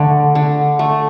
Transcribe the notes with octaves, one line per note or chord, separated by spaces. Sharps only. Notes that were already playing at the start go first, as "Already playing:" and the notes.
Already playing: D3 A3
D3
A3